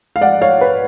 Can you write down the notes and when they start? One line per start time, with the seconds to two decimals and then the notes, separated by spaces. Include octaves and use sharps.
0.16 F5
0.21 D5 F#5
0.41 C#5 F5
0.61 B4